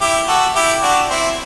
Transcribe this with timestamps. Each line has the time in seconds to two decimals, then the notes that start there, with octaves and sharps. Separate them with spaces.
0.01 E4 G4
0.28 F#4 A4
0.55 E4 G4
0.82 D4 F#4
1.10 C4 E4